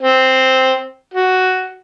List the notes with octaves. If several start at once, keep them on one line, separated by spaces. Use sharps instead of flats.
C4
F#4